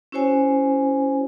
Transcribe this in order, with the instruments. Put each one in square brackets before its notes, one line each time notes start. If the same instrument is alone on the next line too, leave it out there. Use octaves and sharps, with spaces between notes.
[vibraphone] C#4 E4 F#4 C5 C#5 G#5